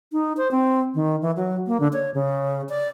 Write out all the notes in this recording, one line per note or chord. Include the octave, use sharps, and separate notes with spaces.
D#4
C5
C4
D#3
E3
F#3
A#3
D3
C#5
C#3
D5